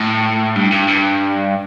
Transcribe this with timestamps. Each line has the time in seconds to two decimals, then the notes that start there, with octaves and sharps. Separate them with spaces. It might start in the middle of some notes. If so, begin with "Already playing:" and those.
Already playing: A2
0.56 G2
0.72 G2
0.88 G2